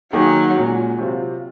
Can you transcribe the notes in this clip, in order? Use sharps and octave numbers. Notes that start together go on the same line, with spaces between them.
D#3 F#3 A#3 D#4 G#4
A#2 G#3 C#4 F#4
C3 F#3 C4 F4